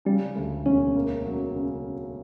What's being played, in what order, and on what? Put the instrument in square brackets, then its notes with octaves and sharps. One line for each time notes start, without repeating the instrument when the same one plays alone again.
[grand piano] C#3 [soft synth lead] G3
[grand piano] D2
[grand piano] E1 [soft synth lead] C#4
[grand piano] A#3
F#3
C#3